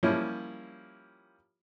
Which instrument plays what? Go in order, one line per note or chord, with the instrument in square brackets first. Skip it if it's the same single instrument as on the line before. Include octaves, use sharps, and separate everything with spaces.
[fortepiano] F3 G3 A#3 C#4 E4